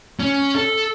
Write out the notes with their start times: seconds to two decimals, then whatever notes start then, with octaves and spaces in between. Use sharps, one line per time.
0.20 C#4
0.55 A4